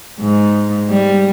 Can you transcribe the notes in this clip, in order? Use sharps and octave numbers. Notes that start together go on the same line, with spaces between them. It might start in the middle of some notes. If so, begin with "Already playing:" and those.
G#2
G3